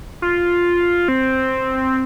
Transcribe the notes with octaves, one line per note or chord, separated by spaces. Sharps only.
F4
C4